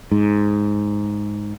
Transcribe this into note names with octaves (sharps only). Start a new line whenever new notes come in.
G#2